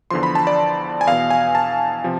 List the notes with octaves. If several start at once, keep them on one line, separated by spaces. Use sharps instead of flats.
E2 D3 F3 C6
B5
A5
D5
G#5
E2 B2 F5
G#5
A5
C3 F3